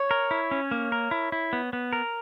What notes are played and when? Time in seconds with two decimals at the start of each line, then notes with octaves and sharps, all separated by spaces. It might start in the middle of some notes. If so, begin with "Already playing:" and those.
Already playing: C#5
0.11 A#4
0.31 E4
0.51 C#4
0.71 A#3
0.92 A#4
1.11 E4
1.32 E4
1.53 B3
1.73 B3
1.93 A#4